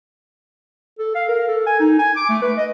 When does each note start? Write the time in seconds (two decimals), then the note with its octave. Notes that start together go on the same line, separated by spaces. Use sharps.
0.99 A4
1.15 F5
1.28 A#4
1.48 A4
1.66 G#5
1.80 D#4
1.99 G#5
2.16 D6
2.29 A3
2.42 B4
2.57 D#5